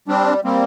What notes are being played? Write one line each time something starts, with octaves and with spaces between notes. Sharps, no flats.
G3 C4 D4
G3 A#3 C4